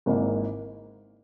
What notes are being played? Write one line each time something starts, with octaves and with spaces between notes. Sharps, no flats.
G#1 G#2 E3 A#3